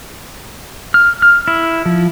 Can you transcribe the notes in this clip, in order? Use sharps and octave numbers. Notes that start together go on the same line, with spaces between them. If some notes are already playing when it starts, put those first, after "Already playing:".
F6
F6
E4
F3